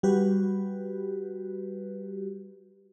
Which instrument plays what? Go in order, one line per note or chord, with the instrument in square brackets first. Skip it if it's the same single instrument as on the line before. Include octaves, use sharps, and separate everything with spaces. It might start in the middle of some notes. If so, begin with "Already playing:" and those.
[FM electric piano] G3 F#4 G4 B4